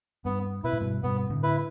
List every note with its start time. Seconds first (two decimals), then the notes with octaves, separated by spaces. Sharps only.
0.25 G2 B3
0.64 B2 E4 B4
0.73 A2
0.81 G2 B2
1.03 G2 B2 B3
1.30 A2 D3
1.43 E4 B4